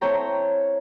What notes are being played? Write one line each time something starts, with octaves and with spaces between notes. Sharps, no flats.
C4 E4 A4 C#5 G5 A#5